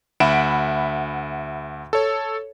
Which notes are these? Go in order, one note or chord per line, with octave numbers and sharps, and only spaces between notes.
D2 E5 F#5 B5 D7 E7
A4 C#5